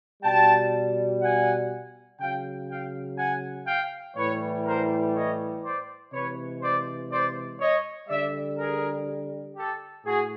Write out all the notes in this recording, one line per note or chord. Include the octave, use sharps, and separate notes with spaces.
B2 G3 G5 A5
F#5 G#5
C#3 F#3 F5 G5
F5 G5
F#5 G#5
F5 G5
A2 E3 G3 B4 C#5
A#4 C5
C#5 D#5
C5 D5
C3 E3 G#3 B4 C#5
C5 D5
C5 D5
C#5 D#5
D3 G3 D5 E5
G#4 A#4
G4 A4
A2 F#4 G#4